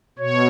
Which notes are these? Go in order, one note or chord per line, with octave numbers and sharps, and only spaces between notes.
B2 C#5